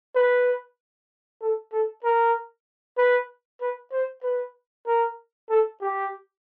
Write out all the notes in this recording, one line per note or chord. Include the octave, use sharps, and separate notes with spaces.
B4
A4
A4
A#4
B4
B4
C5
B4
A#4
A4
G4